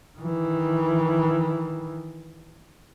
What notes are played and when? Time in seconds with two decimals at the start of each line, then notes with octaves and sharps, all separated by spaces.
0.19 D#3 E3